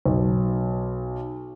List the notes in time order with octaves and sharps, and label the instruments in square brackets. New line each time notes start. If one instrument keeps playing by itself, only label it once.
[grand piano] B1